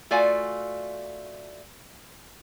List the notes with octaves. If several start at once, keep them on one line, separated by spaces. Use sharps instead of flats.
A3 F4 F#4 D5 F5 G#5